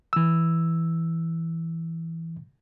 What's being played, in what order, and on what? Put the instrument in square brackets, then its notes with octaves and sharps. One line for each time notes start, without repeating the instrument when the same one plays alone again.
[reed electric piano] E3 E6